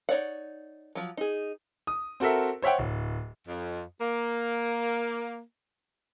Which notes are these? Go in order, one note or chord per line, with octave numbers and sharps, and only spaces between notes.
D#4 C#5 D5 F#5
F3 F#3
D#4 G#4
D#6
C4 F#4 A4 A#4 E5
C5 C#5 E5 F#5 G5
D1
F2
A#3